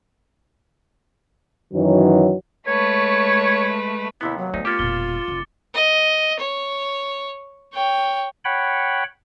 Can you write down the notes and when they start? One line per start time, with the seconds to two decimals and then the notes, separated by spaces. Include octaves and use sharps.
1.74 F#2 D#3 E3 F#3
2.67 G#3 A3 B4 C#5
4.21 D#2 C3 B3 E4
4.38 F#3
4.54 D2 A3 B3 D#4
4.65 A#3 C#4 F4 G4 D6 A6 C#7
4.79 E1 A#2 G7
5.28 F1
5.74 D#5
6.40 C#5
7.74 C#5 G5
8.45 C#5 F#5 G5 B5